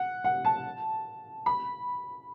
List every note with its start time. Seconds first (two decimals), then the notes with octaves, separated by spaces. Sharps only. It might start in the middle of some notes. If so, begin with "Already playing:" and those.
Already playing: F#5
0.24 F#5
0.45 A5
1.46 B5